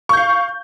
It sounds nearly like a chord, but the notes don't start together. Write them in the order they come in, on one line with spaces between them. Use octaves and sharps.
C#6 G6 F5